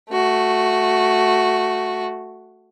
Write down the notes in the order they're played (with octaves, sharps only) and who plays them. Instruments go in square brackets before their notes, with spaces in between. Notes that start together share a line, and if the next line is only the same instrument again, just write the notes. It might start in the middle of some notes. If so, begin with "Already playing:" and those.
[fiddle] A3 F#4